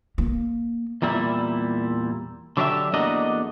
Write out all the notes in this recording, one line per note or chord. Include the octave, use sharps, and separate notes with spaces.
A#3
E2 A#2 G3 E4
D3 F#3 D4 G4 B4 E5
E2 A3 A#3 D4 F#4 D#5